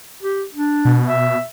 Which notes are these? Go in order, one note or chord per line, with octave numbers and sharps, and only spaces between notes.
G4
D4
B2
E5